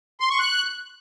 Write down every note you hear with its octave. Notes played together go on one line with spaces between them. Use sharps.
C6
C#6
F#6